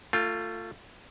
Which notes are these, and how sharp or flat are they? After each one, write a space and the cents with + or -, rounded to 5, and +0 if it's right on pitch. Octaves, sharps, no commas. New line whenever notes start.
A3 +25 F4 +0 G5 +30